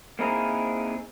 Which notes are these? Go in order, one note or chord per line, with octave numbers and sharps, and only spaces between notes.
A#3 C4 D#4 E4 G#4 A#4